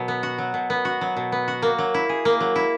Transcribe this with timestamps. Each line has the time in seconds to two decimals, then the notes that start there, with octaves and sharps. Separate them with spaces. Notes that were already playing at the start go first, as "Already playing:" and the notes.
Already playing: B2 F#3
0.08 B3
0.23 F#4
0.38 F#3
0.54 B2
0.70 B3
0.85 F#4
1.01 F#3
1.17 B2
1.32 B3
1.48 F#4
1.62 A#3
1.78 F#3
1.94 E4
2.09 G#4
2.25 A#3
2.40 F#3
2.56 E4